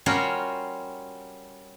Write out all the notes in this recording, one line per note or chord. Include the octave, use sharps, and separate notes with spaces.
G3 C#4 F4 F#4 A#4 C#5